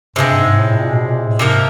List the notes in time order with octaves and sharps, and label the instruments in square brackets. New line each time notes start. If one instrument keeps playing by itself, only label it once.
[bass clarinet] G2 [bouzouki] C3 D#3 G#3
[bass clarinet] G#2
A2
A#2
B2
A#2
A2
[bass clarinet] G#2 [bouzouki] C3 F3 A#3